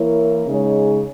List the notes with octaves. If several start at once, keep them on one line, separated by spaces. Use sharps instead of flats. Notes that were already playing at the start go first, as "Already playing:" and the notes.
Already playing: E3 A#3 E4 A#4 C#5
C#3 G#3 D#4 G#4 C#5